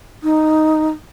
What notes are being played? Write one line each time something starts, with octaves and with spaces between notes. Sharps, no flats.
D#4